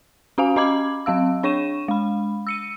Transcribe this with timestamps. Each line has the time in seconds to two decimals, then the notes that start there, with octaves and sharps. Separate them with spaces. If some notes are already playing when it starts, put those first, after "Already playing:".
0.38 C#4 F#4 F5 G#5
0.56 C#4 D#5 B5 D6 G#6 F#7
1.06 F#3 C4 F5 E6
1.43 D4 C#5 C#6 D#7 E7
1.88 G#3 B5
2.47 E6 C#7 D#7